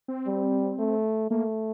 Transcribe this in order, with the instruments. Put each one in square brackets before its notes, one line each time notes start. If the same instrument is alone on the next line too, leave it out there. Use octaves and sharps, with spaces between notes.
[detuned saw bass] C4
[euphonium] G3
A3
[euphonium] A3 [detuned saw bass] A#3